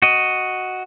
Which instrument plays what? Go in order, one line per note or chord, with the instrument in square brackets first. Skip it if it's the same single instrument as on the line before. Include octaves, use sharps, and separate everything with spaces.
[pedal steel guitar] F#4 D#5